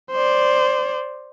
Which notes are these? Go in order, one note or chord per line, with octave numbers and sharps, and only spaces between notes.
C5 D5